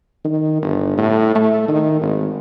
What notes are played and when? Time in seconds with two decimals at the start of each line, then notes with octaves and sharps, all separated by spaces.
0.25 D#3
0.62 G1
0.98 A2
1.35 A3
1.68 D#3
2.01 G#1